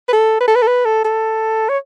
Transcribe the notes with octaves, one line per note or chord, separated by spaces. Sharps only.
B4
A4
B4
A4
B4
A4
B4
A4
A4
C#5